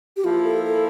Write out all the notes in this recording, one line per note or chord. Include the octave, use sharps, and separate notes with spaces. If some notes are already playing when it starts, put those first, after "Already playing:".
G4
F3 A#3 E4 F4
A4
A4